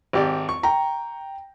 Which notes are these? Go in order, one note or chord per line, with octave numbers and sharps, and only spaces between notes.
G#1 G4 D5
C#6
G5 A#5